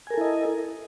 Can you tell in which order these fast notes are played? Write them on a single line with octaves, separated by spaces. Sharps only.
G#5 A#4 A4 E4 D#5